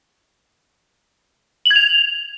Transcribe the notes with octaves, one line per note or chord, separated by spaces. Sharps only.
F#7
G#6
F7